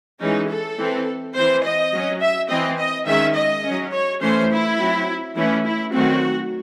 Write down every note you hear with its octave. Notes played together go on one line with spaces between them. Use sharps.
E3 G#3 C#4 D#4
A4
E3 C4
E3 C4 C5
D#5
F#3 C#4
E5
E3 C4 D#5
D#5
D#3 G#3 C#4 E5
D#5
F#3 C#4
C#5
E3 A3 C#4 C5
E4
F#3 C4
E3 A3 C#4 E4
E4
D#3 F#3 A3 C4 F#4